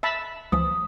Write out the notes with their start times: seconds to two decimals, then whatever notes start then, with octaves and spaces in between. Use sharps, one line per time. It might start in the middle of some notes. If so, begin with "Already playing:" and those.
0.03 E5 A5 B5
0.52 C#2 E3 F3 D#6